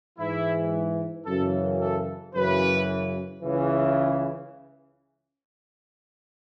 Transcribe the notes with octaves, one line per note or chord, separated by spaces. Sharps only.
G#2 E3 E4
F#2 C#3 E3 A4
A4
F#2 C#3 E3 B4
C#2 C#3 E3